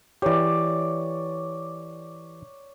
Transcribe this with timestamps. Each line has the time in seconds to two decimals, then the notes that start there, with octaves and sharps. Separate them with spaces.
0.22 E3 G4 C#5 D5